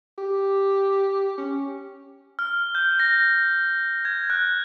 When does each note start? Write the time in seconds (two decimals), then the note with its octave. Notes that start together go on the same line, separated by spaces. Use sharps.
0.18 G4
1.38 C#4
2.39 F6
2.75 G6
3.00 A#6
4.05 G#6
4.30 F#6